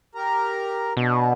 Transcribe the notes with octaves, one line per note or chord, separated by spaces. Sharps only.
G4 A#4 A#5
B2 D4 B4